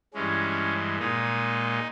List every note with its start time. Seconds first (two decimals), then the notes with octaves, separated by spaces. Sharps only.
0.14 G2 E3 G#3 C#4
0.98 A#2 G#3 D#4